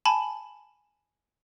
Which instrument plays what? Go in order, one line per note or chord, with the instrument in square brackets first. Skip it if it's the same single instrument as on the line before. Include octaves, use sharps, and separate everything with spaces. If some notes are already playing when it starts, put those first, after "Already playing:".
[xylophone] G#5 A5 B5